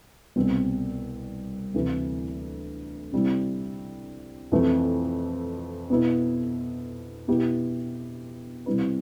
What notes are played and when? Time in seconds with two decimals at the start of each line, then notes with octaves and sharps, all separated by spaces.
0.36 C2 B2 G3 C4
1.74 D2 C3 E3 A3
3.12 C3 G3 C4 E4
4.52 F2 E3 A3 C4
5.90 B2 B3 E4
7.28 B2 B3 E4 G4
8.66 C3 G3 C4 E4 B4